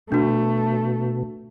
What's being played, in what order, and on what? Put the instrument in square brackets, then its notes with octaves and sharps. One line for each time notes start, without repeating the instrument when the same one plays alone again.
[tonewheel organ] B2 [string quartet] A3 [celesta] D4 F#4